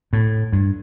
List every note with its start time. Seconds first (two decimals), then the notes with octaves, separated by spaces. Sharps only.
0.13 A2
0.53 G2